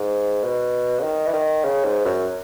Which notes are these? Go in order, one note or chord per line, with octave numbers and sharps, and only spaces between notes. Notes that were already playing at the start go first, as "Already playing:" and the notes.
Already playing: G#2
B2
C#3
D#3
E3
D#3
C#3
G#2
F#2